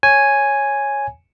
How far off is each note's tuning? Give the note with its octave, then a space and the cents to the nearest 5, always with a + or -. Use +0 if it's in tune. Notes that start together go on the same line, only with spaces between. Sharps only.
C#5 -5 G#5 +0